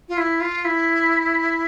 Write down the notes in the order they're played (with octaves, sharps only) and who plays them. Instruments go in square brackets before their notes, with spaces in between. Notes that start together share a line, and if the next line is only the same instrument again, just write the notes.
[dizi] F4
E4
F4
E4